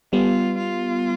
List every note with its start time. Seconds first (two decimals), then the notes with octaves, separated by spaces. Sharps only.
0.13 G3 B3 F4
0.58 F4